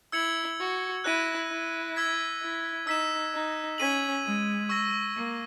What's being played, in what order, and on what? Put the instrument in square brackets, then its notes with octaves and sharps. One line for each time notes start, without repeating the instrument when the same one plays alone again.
[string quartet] E4 [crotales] E6 G#6 C#7 F#7
[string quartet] F#4
[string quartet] E4 [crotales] F#6 A#6 D#7
[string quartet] E4
[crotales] E6 G#6 B6
[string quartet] E4
[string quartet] D#4 [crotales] E6 B6 E7
[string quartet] D#4
[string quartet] C#4 [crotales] G#6 B6 D#7 F#7
[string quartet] G#3
[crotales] C#6 E6 A#6
[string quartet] A#3